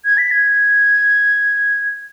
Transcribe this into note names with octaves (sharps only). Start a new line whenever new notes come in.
G#6
B6
G#6